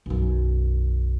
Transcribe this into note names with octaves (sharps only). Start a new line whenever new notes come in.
B1 F#2